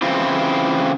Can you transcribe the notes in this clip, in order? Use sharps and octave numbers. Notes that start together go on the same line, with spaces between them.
C#3 E3 C4 E4 F4